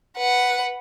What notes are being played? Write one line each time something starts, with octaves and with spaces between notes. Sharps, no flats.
B4 F#5